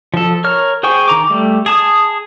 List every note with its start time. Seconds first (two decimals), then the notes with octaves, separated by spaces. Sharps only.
0.14 F3 A4
0.44 A#4 C#5 F6
0.83 G#4 C5 G5 G#5 C#6
1.08 D#3 A#5 D6
1.30 G3 A3
1.66 G#4 A5 D#6